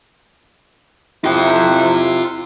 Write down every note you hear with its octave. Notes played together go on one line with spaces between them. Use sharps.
C3 E4 F4 G5